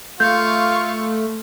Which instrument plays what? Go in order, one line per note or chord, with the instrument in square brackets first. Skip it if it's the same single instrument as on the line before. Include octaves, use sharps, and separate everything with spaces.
[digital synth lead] A3 [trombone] F4 [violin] F5 C#6 [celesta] G6